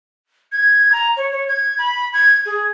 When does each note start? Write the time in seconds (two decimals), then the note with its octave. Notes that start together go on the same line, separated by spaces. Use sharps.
0.52 G#6
0.92 A#5
1.17 C#5
1.32 C#5
1.48 G#6
1.79 B5
2.14 G#6
2.46 G#4